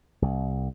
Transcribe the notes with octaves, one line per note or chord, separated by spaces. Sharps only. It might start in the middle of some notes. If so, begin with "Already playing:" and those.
C2